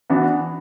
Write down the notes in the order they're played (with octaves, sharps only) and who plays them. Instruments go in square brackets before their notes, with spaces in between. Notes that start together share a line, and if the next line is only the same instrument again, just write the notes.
[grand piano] E3 B3 D4 F#4